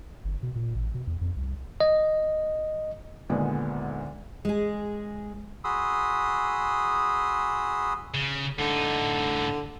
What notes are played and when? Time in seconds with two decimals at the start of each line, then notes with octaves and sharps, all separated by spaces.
0.25 G1
0.43 B2
0.55 A#2
0.75 A1
0.95 B2
1.07 E2
1.21 F2
1.36 C2
1.80 D#5
3.29 D2 A#2 D3 D#3 G#3 B3
4.45 G#3 G#4
5.64 F#4 G#4 B5 C6 D#6 E6
8.14 C#3
8.59 A2 D3 D#4